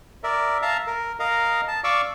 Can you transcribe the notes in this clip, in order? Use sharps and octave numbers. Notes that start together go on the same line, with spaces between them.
A#4 D5 E5
E5 F5 A5 A#5
A#4
A#4 D#5 F5 A#5
A5
D5 F5 C#6 D6 E6